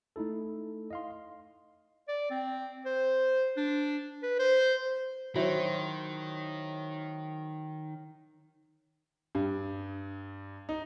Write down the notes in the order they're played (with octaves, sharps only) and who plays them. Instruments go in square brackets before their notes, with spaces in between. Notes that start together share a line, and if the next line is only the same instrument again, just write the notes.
[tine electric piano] A3 D#4 E4 A4
D#5 F5 C6
[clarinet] D5
C4
C5
D4
B4
C5
[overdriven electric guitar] D#3 [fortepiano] F#3 E4 C5 [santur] C#5 C6
[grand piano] G2
D#4